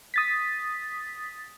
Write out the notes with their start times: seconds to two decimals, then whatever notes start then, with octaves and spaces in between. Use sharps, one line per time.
0.14 D#6 A6 B6